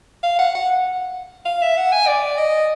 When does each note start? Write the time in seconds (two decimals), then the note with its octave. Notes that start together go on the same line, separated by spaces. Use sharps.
0.23 F5
0.39 F#5
0.55 F#5
1.45 F5
1.62 E5
1.77 F#5
1.92 G#5
2.07 D5
2.38 D#5